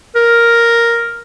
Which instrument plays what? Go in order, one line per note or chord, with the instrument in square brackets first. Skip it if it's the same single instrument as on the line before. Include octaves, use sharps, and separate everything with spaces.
[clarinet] A#4